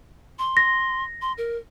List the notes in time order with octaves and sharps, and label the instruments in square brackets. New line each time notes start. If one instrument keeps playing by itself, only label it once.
[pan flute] C6
[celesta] A#6
[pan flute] C6
A#4